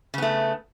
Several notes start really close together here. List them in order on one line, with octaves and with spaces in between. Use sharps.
C#3 B3 A3